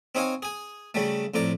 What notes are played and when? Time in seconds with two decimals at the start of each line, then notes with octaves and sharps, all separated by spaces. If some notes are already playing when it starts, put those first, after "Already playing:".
0.15 C4 D#4 C#5 D#5 F5 G#5
0.42 G#4 G#5
0.94 C#3 F#3 G3 A3
1.34 F2 A2 D5 A#5